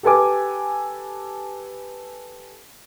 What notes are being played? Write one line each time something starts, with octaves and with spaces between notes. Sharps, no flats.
G4 A4 B4 G#5 D6